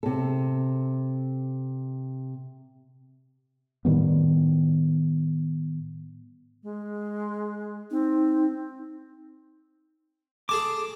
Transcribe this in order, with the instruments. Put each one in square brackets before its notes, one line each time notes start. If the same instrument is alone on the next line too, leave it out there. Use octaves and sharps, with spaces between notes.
[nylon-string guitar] C3 A4
[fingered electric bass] A2 D#3 G3 B3
[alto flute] G#3
[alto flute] C4 [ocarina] D#4
[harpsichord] G#4 A4 G#5 [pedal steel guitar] D6